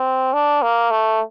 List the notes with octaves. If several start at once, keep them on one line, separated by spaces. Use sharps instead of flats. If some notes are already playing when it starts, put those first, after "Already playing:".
Already playing: C4
D4
A#3
A3